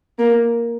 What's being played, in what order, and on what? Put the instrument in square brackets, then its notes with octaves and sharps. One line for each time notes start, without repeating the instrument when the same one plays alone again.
[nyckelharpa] A#3